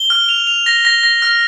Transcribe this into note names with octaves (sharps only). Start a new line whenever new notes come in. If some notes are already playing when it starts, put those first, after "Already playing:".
Already playing: G7
F6
F7
F7
A#6
A#6
A#6
F6